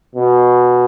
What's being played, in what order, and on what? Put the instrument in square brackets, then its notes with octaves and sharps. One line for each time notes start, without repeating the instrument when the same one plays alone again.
[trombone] B2